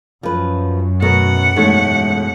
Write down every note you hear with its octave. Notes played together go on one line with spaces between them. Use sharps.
F#2 F3 B4
B2 A3 A#4 F#5
E1 G#2 A3 C#5